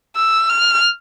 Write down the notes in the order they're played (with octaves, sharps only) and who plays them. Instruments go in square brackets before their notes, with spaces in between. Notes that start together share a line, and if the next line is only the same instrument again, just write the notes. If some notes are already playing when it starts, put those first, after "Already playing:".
[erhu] E6
F6